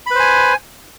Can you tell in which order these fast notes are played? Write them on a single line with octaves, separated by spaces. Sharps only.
B5 B4 C5 G#5